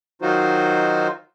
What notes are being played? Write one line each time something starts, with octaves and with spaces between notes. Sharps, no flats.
D#3 F#3 D#4 F4 F#4 C5